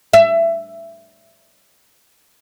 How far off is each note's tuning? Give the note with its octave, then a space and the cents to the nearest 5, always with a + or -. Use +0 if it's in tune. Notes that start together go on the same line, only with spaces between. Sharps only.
E5 +20